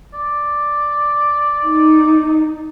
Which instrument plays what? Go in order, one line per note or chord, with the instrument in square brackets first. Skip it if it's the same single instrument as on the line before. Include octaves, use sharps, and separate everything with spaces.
[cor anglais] D5
[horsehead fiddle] D#4